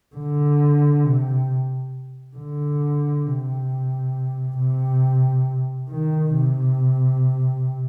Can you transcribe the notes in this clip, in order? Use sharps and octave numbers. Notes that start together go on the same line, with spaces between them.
D3
C3
D3
C3
C3
D#3
C3